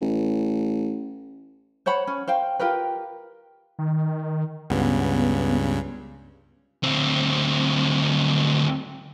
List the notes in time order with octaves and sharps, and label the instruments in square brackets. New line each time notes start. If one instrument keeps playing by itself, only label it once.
[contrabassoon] A1
[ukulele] C5 C#5 F#5 B5
C#4
C5 F5 G5
F4 G4 A#4 B4
[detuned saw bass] D#3
[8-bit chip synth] C#2 G2 C#3 [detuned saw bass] B3
[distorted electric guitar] D2 C4